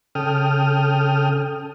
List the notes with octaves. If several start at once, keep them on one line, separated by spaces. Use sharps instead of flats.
C#3 A4 G5 D#6 F6